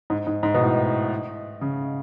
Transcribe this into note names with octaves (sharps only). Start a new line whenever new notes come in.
G#2
G#2
G#2
B2
A2
C#3